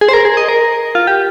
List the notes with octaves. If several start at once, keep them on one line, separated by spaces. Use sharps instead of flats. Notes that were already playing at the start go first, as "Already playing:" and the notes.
G#4
C5
A#4
G#4
D#5
A#4
F4
G4